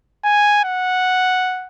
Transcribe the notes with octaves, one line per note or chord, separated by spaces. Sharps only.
G#5
F#5